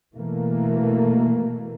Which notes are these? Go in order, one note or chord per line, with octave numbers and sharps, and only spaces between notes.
B2 E3 A3 A#3